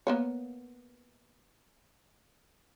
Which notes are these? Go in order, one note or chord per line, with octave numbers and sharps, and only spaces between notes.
A#3 B3 C#5